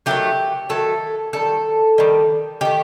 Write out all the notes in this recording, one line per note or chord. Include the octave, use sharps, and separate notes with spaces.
D#3 F#3 A3 G4
D#3 F#3 A3 A4
D#3 G3 A4
D#3 G3
D#3 A3 G4